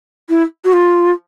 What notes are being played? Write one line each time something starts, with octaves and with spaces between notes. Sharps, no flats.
E4
F#4
F4